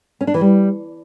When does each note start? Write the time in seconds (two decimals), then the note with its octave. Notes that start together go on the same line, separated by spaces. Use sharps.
0.21 C#4
0.27 D4
0.34 E3
0.41 G3